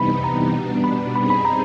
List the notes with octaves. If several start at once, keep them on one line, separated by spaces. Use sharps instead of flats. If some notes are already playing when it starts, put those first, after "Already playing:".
Already playing: C3 E3 G3 B3 D#4 B5
A#5
B2 G3 B3 D4
B5
G3 C4 D#4 G#4 B5
B5
A#5